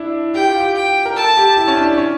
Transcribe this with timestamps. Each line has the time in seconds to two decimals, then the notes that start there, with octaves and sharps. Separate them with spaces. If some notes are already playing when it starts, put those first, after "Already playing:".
Already playing: D4 E4
0.34 G4 G5
0.47 F4
0.60 G4
0.75 G5
1.06 A#4
1.16 A4 A5
1.37 G4
1.57 E4
1.68 C#4
1.77 D4
1.98 C#4